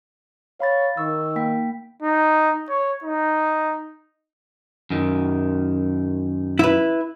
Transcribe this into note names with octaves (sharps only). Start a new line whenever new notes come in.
C#5 F5 B5 A6
D#3 C#6 E6
A#3 G5 B6
D#4
C#5
D#4
F#2 D#3
E4 B4